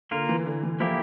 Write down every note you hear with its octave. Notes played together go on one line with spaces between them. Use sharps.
D3 A#3 F4 A#4
E3
D3
E3
F3 A#3 E4 G4